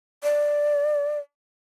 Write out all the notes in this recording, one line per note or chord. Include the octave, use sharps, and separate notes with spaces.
D5